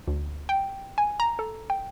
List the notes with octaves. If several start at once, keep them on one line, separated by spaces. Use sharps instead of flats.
D2
G5
G#5
A#5
A4
G5